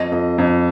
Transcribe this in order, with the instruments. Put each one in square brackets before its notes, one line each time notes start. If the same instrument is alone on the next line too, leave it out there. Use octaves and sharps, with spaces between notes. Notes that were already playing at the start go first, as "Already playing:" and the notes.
Already playing: [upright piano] F2 D#5
F2
F2